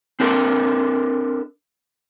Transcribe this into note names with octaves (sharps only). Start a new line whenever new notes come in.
C4 D4 A4 A#4